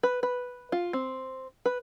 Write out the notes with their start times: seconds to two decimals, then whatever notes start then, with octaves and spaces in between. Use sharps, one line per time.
0.03 B4
0.23 B4
0.72 F4
0.93 C4
1.66 B4